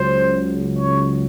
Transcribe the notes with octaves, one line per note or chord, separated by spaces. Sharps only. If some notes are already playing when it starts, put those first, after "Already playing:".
Already playing: C#2 C#3 F#3 C5
C#5